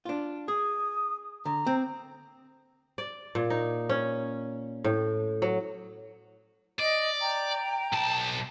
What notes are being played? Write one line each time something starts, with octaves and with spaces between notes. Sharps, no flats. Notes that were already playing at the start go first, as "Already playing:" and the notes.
D4 F4
G#4 D#6
D3 A#5
C4
D5
A#2
D#4
C#4
A2
F#3
D5 D#5
G5 A#5
B1 A5